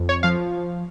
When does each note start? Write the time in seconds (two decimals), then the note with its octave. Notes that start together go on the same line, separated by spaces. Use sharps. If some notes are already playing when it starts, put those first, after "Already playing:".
Already playing: F2
0.09 C#5
0.23 F3 F5